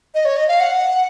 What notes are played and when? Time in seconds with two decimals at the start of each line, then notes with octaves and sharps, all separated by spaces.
0.15 D#5
0.25 C#5
0.37 D#5
0.48 F5
0.60 F#5